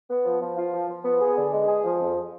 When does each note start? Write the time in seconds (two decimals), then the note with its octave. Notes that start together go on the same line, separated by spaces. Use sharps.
0.09 B3
0.25 F3
0.41 F3
0.57 F4
0.73 F3
0.89 F3
1.05 B3
1.21 G#4
1.37 D3
1.52 G#3
1.68 G#4
1.84 F3
2.00 F2